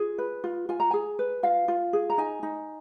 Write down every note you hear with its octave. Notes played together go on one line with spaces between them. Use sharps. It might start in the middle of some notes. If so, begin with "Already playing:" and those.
Already playing: F4 G#4
B4
F4
F4 G#5
A#5
G#4 G#5
B4
F4 F5
F4
G#4
A#5
D#4 G#5
D#4